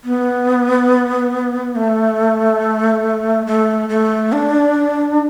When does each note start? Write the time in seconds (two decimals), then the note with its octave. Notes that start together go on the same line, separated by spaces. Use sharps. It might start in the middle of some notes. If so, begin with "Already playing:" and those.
0.04 B3
1.76 A3
3.47 A3
3.89 A3
4.32 D4